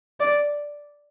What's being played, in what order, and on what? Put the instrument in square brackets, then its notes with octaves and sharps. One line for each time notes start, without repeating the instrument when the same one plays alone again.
[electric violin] D5